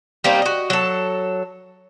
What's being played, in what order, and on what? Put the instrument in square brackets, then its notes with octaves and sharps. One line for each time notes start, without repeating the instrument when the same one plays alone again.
[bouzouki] G3 A#3 C4 D#4
F#4 D#5
F#3 A4